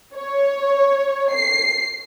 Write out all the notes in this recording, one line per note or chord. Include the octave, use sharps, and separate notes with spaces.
C#5
C7